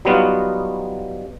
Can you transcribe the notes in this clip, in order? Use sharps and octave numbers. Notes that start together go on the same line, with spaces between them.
F#3 G3 B3 D#4 F4 F#4